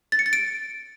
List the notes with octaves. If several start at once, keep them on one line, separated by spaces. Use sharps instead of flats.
A6
C#7
A6
D7